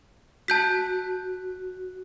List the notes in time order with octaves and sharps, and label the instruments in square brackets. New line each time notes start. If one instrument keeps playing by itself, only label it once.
[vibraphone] F#4 [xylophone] A5 G6 B6